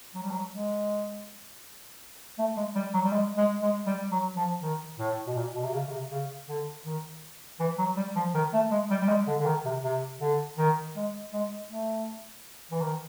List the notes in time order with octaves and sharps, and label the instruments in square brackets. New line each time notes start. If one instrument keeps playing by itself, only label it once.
[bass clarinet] F#3
G3
F#3
G#3
A3
G#3
G3
F#3
G3
G#3
G#3
G#3
G3
F#3
F3
D#3
A2
B2
A#2
B2
C3
C#3
C#3
C3
C#3
D3
D#3
E3
F#3
G3
F3
D#3
A3
G#3
G3
G3
G#3
D3
D3
D#3
C3
C3
D3
D#3
G#3
G#3
A3
E3
D#3